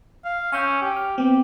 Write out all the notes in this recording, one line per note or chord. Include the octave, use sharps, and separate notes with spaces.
F5
C#4 G#5 E6 G6
G4
F6
B3 C4 G4